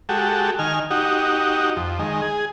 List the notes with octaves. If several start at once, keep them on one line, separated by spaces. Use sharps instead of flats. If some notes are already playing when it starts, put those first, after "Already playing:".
G#3 F#4 G4 A4
D#3 G#5 F6
D#4 F#4 G4
F2
D#3 G#3
G#4